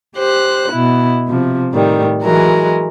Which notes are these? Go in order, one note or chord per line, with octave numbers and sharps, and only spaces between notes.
G4 C5 F#6
B2 E4
C3 F3
A2 D#3 G3
E3 F#3 G#3 A#4